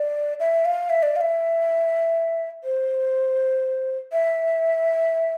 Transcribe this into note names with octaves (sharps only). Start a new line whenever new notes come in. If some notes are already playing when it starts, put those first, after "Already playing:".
Already playing: D5
E5
F5
E5
D5
F5
E5
C5
E5